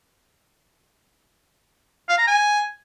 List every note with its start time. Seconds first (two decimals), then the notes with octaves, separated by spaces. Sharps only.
2.09 F5
2.18 A#5
2.27 G#5